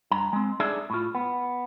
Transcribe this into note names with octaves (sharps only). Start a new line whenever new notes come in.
G2 A#5
G#3 C4
D4 D#4 G#4 A4 D5 E5
A2 F4
B3